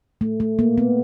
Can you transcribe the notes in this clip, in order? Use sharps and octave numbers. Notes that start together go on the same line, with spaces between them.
A3
A3
A#3
B3